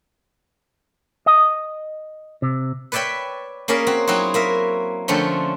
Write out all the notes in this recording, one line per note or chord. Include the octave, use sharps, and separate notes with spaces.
D#5
C3
B4 C#5 D5 E5 G5 B5
A#3 C#4 G#4 A#4 D5 B5
C4 F#4
F#3 C4 D#4 E4 F#4
A#3 A#4 E5
D3 F3 A3 C4 C#4